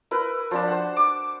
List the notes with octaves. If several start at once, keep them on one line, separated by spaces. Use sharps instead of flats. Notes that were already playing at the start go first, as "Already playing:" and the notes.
E4 A#4 B4
F3 D4 A5
C5 F#5
D6